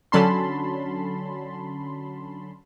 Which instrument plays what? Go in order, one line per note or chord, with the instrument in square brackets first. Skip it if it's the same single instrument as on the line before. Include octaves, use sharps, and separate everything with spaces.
[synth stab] D3 F#3 C#4 A5 B5 C6